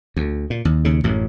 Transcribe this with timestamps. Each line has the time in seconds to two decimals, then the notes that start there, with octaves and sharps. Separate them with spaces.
0.16 D2
0.50 A#2
0.65 D#2
0.85 D#2 C#3
1.04 A1 F#2 A2